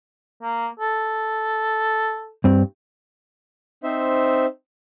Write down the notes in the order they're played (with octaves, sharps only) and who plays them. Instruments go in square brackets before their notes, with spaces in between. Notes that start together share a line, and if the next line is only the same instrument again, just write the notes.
[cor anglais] A#3
A4
[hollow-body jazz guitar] G2 C4
[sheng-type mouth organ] C4 D#4 C5 E5